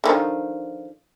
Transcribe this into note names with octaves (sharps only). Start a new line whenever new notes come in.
D3 D#3 F3